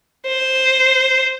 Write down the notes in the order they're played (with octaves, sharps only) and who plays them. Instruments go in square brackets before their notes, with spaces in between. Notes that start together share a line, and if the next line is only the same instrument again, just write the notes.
[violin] C5